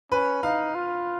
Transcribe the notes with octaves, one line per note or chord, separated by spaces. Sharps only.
C#4 B4
D#4 F5
F4